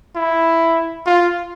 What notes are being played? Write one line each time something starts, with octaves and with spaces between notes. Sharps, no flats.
E4
F4